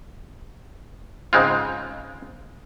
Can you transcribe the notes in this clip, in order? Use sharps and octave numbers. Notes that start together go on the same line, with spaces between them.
G#2 C#3 G#3 C4 F4